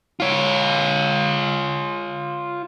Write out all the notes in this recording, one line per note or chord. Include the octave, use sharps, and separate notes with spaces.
F4 C#5